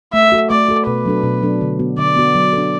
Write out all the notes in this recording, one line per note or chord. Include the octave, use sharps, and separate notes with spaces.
A3 E5
F#4 A4
A3 D5
F#4 A4
B2 B4
F#3 D4 A4
B2
F#3 D4 A4
D3
B3 F#4
D3 D5
B3 F#4
F#3
D4 A4